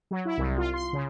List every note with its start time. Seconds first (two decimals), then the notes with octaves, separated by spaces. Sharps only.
0.11 F#3
0.25 E4
0.38 C2
0.58 F4
0.74 C6
0.93 C#3